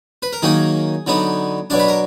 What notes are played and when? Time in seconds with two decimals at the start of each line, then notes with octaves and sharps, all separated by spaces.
0.23 B4
0.33 A#4
0.42 D#3 F#3 A#3 D#4 G#4
1.07 D3 F#3 B3 D#4
1.70 B2 F#3 D4 D5
1.79 B4
1.88 A#4